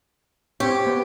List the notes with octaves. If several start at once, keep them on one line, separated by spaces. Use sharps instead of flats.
C4 G4 C#5
B3